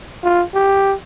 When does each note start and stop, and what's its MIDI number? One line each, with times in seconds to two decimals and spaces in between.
0.23 0.43 65
0.54 0.94 67